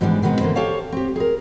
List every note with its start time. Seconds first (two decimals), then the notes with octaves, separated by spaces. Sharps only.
0.01 G#2 E3 G3 G#3 B3 D4
0.22 B2 D#3 G3 G#3 B3 C4
0.41 D3 E3 A#3 C5
0.55 G4 A4 C5 C#5 F5 A5
0.92 C4 G4
1.16 G#4 A#4